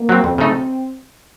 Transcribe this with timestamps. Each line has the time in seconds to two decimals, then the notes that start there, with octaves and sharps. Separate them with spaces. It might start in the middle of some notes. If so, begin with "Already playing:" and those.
Already playing: A#3
0.09 F#3 C4
0.23 F2 C4
0.38 C#3 A3 D#4 A4